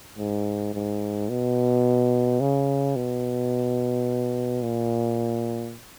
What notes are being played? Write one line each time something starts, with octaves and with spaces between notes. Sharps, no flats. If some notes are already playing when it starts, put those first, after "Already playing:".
G#2
G#2
B2
C#3
B2
A#2